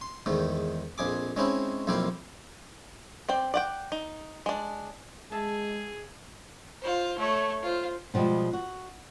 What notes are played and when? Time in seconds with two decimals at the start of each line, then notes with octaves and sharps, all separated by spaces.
0.01 C6
0.26 E2 G#2 D#3 A3
0.98 A#1 F2 G#4 D6
1.36 G#3 C4 C#4 D#4 E4
1.87 B1 F2 A#3 E4 F5 G5
3.29 C4 D5 G5
3.54 D5 F#5 G5
3.92 D#4
4.46 G#3 D4
5.32 G#3 G#4 E5 A5
6.82 F4 C5
7.19 A3 C#5
7.63 F4 C5
8.14 B2 F3 G3 G#3
8.53 F#4